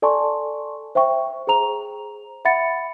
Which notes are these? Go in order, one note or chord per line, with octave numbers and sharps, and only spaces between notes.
A4 D5 G#5 A5 C6 C#6
C5 E5 G5 C#6
G#4 C5 A#5 F7
E5 F#5 B5 A6 C#7